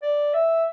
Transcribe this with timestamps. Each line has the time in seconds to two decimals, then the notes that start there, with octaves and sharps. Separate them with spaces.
0.02 D5
0.34 E5